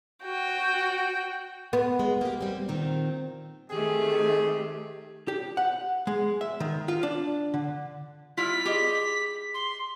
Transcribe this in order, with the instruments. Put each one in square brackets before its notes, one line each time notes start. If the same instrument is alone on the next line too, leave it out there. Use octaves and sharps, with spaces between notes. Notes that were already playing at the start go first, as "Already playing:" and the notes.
[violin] F#4 G5
[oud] B3
[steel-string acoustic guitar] G#3
A#3 G4
G3 C4
A#2 D#3 C4
[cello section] D#3 A3 [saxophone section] C4 G#4 [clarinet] G4
[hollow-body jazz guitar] G4
F#5
G#3
E5
D#3
F4
D4
D3
[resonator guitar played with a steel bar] G3 E4 F4 [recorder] B6
[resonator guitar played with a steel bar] G4 G#4 D#5
[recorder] C6